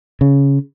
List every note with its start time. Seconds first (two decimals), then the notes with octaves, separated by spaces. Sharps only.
0.21 C#3